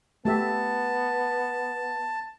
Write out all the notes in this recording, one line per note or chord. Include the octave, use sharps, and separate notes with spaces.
A3 B3 G4 E5 A5